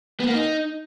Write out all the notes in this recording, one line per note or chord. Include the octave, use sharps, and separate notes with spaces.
B3
A#3
D#4